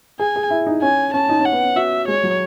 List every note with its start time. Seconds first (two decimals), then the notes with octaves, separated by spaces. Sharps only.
0.19 G#4 G#5
0.36 G#4
0.50 E4
0.67 D#4
0.82 C#4 G#5
1.14 C#4 A5
1.29 D#4
1.41 C#4 F#5
1.52 B3
1.64 C#4
1.76 F#4 E5
2.08 G#3 C#5
2.23 F#3